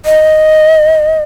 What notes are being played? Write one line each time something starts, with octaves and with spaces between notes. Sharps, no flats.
D#5